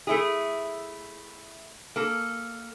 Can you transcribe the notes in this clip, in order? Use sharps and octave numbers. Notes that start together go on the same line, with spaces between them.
A3 E4 G#4
A#3 A4